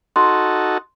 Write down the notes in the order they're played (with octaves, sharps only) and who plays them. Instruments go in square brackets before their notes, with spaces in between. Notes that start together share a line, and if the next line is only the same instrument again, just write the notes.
[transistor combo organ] D#4 F#4 A4 [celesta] C6